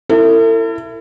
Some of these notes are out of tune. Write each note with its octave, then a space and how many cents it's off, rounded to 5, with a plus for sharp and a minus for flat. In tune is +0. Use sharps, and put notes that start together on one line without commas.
E4 +20 A4 +45